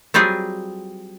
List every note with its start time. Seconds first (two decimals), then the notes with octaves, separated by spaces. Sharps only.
0.14 F#3 G3 C4 F4 G#4